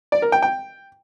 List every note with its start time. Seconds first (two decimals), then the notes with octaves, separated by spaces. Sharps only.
0.12 D5
0.22 A#4
0.32 G5
0.42 G5